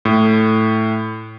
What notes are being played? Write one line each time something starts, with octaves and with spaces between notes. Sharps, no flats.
A2